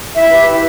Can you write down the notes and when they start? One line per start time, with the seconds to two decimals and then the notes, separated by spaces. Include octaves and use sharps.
0.14 E4 E5
0.30 G4 B4
0.46 E4